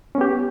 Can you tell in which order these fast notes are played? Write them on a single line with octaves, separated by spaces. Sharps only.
C#4 B3 G4